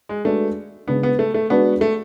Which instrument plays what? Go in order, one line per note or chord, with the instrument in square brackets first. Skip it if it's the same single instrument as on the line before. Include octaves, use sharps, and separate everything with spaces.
[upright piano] G#3
[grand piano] G#3 D4 F#4 B4 D5 [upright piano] A3
[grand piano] C#3 G#3 D4 [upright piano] B3
[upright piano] B3
A3
A3
[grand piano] G#3 D4 F#4 B4 D5 [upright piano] B3
[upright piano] A3